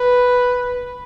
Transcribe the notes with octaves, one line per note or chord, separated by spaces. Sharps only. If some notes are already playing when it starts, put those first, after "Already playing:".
Already playing: B4